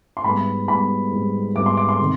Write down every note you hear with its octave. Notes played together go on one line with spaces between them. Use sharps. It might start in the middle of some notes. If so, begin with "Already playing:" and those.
C6
G#2 G3 B3 B5
G#2 G3 B3 B5
G#2 G3 B3
G#2 G3 B3 D6
C6
D6
C6
C3 D#3